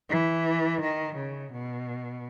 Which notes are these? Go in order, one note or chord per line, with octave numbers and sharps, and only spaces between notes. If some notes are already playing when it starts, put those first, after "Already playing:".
E3
D#3
C#3
B2